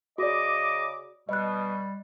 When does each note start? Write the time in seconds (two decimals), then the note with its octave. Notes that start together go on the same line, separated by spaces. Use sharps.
0.18 C#3 F#4 D5 D#5 D6
1.29 B2 G3 D#5 F#6